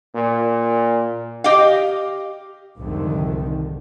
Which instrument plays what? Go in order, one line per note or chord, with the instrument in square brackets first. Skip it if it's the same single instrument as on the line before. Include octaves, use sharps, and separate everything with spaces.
[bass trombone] A#2
[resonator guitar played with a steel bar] G4 D#5 F5
[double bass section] C2 F2 G#2 D3 D#3